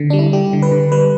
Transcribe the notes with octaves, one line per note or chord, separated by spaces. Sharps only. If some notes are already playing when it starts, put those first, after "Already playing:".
Already playing: D3
G3 D4
E4
G3 G4
D3
B4
D3
G3 B4